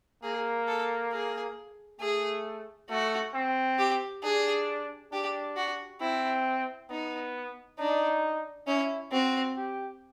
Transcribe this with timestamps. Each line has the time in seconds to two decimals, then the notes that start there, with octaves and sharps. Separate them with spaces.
0.23 A#3 G#4
0.68 A4
1.13 G#4
2.01 A3 G#4
2.90 A3 F#4
3.34 C4
3.79 G4
4.23 D4 G#4
5.12 D4 G4
5.56 F#4
6.01 C4 E4
6.90 B3 D#4
7.79 D4 D#4
8.67 C#4 E4
9.12 C4 F#4
9.57 G4